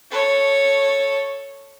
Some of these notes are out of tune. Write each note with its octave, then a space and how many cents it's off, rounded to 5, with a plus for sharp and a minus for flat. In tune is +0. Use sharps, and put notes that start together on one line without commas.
A4 +0 C#5 -5